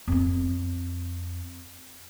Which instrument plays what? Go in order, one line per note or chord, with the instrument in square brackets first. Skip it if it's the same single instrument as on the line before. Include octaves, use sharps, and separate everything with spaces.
[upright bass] F2 C4